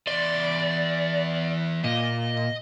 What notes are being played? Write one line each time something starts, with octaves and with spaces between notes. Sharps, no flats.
E2 D5 C6
A#2 D#5